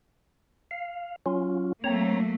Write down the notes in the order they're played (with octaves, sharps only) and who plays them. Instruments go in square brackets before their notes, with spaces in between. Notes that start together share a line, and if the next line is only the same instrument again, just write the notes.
[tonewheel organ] F5
F#3 C#4 F4
[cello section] F#3 A3 A#3 [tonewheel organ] C4 C#5 A#5